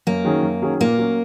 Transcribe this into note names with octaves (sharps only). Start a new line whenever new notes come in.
F#2 A#3
D#3 F#3 C#4 G#4
F#2
D#3 F#3 C#4 G#4
A#2 A#3
F#3 C#4